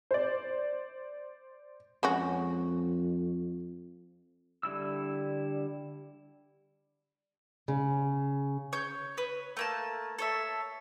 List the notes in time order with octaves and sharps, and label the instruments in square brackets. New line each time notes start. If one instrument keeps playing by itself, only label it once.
[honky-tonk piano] C5 D5
[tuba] F2 [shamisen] G#3 C#4 F#4
[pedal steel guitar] D3 G3 E4 E6
[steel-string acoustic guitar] C#3
[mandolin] C#5 G6
B4 C#5
A3 A#3 A5
A4 C#5 E5